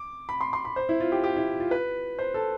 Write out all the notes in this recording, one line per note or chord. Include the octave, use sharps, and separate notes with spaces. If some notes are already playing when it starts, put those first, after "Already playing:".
Already playing: D6
B5
C6
C6
B5
C5
E4
F4
G4
G4
E4
F4
B4
C5
A4